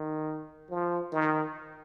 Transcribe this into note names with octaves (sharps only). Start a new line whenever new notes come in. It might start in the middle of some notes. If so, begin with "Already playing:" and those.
Already playing: D#3
F3
D#3